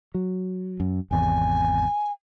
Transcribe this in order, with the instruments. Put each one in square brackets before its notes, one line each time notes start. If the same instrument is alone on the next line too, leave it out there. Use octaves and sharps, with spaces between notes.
[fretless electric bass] F#3
F#2
[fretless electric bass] G#1 E2 C3 [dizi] G#5